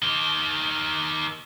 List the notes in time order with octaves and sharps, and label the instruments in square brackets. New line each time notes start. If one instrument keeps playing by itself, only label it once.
[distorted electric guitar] D#3 G4